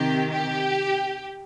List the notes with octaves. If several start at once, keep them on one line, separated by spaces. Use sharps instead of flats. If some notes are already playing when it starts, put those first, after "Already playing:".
Already playing: C3 D#3 G4
G4